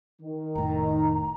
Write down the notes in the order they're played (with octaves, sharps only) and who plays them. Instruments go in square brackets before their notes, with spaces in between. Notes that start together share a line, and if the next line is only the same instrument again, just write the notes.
[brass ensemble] D#3
[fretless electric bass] F1 A2 [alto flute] A#5